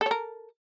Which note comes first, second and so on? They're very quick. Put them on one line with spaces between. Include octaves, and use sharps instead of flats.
A4 C#5 A#4